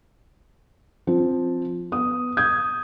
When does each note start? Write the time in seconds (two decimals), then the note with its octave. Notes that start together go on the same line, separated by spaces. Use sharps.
1.07 F3 C4
1.92 B3 D#6
2.37 D#6 G6 G#6